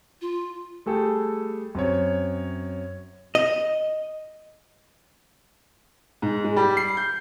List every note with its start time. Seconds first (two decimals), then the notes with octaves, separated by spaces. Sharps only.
0.21 F4
0.86 G3 A3 G#4 A4 G5
1.75 F#2 C4 C#5
3.35 D#5
6.22 G#2
6.44 G#3
6.56 G3
6.77 C7
6.97 G6